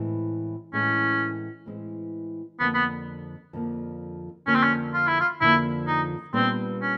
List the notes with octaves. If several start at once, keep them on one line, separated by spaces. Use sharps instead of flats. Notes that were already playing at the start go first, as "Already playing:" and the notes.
Already playing: A2 E3 G#3 C4
A2 E3 G#3 C4 C#4
A2 E3 G#3 C4
F2 D3 F3 A#3 B3
B3
F2 D3 F3 A#3
F2 D3 F3 A#3 C#4
C4
C#4
F4
E4
F4
F2 D3 F3 A#3 E4
D#4
A#2 G3 B3 C4 D4
C#4